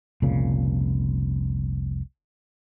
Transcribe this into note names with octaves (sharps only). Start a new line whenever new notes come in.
F1 C2 A#2 C#3